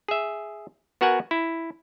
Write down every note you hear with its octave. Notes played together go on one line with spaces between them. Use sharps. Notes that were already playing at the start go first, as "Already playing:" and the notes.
G#4 E5
B3 F#4 A#4 F#5 G#5
E4